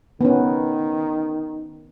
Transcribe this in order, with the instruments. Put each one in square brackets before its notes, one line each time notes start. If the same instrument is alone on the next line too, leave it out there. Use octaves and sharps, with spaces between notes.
[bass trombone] D#3 [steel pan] B3 C#4